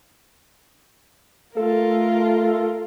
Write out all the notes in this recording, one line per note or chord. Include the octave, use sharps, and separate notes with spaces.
A3 F4 A4 A#4